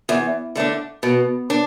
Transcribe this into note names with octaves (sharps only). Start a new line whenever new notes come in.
E2
D3 A3 D4
B2
D4